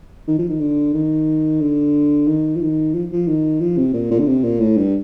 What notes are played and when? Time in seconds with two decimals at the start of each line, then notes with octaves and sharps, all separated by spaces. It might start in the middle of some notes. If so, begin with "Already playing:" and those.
0.28 D#3
0.38 F3
0.49 D#3
0.60 D3
0.94 D#3
1.61 D3
2.27 D#3
2.56 F3
2.61 D#3
2.94 F3
3.12 F3
3.27 D#3
3.60 F3
3.77 C3
3.93 A#2
4.11 A#2
4.19 D3
4.27 C3
4.44 A#2
4.60 A2
4.77 G2